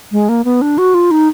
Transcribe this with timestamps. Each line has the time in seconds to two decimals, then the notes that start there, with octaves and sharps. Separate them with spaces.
0.12 G#3
0.29 A#3
0.45 B3
0.62 D4
0.78 F#4
0.94 F4
1.11 D#4